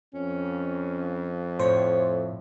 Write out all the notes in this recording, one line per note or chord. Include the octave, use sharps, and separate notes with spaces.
F2 C#4
A2 C5 C#5